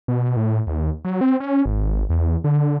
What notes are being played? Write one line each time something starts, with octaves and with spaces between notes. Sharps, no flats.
B2
A2
D#2
F#3
C4
C#4
G#1
E2
D3